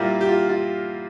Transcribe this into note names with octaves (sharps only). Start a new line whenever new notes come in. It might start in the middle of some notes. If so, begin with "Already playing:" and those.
Already playing: A#2 G3 A#3 E4 G4
G4
F4
F4